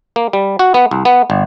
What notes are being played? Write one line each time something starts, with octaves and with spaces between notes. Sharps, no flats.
A#3
G3
F#4
B3
C2
B3
G1